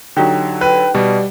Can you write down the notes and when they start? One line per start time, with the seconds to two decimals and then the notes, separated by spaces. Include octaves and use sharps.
0.16 D3 F#3 D#4 F#4 G4
0.61 B4 G5
0.95 B2 G3 D5